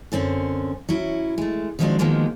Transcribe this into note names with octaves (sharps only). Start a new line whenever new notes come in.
F#2 D3 C4 C#4
F#3 C#4 E4
G#3 A3
D#3 F3 F#3 G#3 C4 D4
D#3 F3 F#3 G#3 A#3 B3